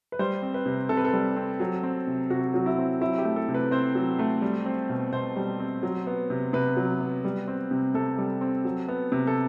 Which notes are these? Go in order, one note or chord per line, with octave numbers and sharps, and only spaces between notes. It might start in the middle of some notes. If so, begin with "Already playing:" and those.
B4
G3 C5
C4
B4
C3
C3 A4
B4
A4
G3
C4
F#3
C4
C3
C3 F#4
F#3 F#4
E4
C4
F#3 E4
G4
A3
A4
C3
B4
C4 C5
F#3
A3
G3
C4
B2
B2 C5
G3
C4
F#3
B3
C3
C3 B4
F#3
B3
G3
C4
C3
C3 A4
G3
C4
F#3
B3
C3
A4